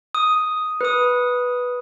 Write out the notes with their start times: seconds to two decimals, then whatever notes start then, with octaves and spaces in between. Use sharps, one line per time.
0.15 D#6
0.81 B4 D#6